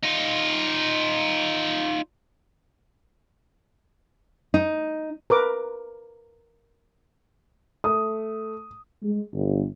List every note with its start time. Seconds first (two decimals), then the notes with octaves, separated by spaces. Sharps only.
0.03 D#4 F4
4.54 D#4
5.30 A#4 B4 D6
7.84 A3 D#6
9.03 G#3
9.34 G1